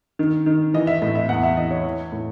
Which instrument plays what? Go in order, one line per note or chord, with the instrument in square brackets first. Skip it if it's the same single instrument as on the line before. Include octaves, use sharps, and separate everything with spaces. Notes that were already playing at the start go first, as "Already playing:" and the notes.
[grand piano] D#3
D#3
E3 D#5
E5
A2 D#5
E5
E2 F#5
E5
E3 D#5
C#5
E3
A2